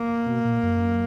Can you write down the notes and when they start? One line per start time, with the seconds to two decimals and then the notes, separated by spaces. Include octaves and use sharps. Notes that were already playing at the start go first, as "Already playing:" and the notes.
Already playing: A#3
0.26 B2
0.45 A#2
0.63 F#2